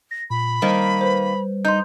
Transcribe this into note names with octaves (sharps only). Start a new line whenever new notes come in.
A#6
A#2 B5
D#3 G3 A#3 C5
B4 C5
D#4 C6 G6